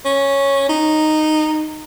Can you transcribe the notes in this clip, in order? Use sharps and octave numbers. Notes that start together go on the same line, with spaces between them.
C#4
D#4